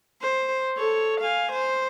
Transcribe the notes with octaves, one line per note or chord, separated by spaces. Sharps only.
C5
A4 C#5
F5 G#5
C5